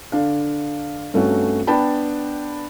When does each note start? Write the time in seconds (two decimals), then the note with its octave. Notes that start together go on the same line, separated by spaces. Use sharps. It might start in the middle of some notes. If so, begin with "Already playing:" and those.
0.12 D3 D4 F5
1.14 G2 A3 C4 C#4 F#4
1.67 B3 D4 B4 G5 A5 B5